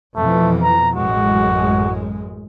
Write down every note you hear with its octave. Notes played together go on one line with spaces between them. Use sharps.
F2 B2 E3 A3
A#5
A1 F#2 G#3 F#4